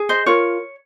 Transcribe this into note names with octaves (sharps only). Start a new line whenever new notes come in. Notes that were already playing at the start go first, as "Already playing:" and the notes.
Already playing: G#4
C5 D#5
F4 A#4 C#5